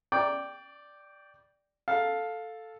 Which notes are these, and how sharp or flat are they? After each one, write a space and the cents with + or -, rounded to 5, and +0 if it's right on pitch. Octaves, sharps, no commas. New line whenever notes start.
D5 +0 G5 +0 D6 -45
A4 +0 F5 +10